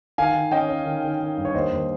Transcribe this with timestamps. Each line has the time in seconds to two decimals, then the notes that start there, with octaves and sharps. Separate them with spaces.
0.18 D#3 F5 G#5
0.34 D#3
0.51 C#4 D#5 G5
0.69 C#4
0.85 D#3
1.03 D#3
1.20 D#3
1.37 G2
1.45 C#5
1.54 D#2 C5 D#5
1.71 D#2